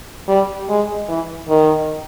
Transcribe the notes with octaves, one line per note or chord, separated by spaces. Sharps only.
G3
G#3
E3
D#3